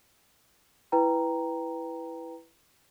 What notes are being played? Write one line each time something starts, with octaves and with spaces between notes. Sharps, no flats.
E4 B4 G5 A#5